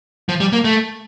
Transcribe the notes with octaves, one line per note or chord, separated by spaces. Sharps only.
F3
G3
A#3
A3